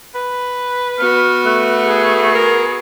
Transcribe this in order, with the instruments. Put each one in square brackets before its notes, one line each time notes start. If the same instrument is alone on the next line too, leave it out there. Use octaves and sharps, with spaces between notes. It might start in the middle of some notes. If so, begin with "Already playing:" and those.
[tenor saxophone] B4
[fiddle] B3 F#4 [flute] F6
[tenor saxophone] A3 [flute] F#6
[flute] G#4
[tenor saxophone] A#4